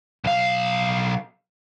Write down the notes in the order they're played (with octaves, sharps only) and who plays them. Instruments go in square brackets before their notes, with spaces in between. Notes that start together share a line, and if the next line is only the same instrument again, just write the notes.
[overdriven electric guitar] B1 F5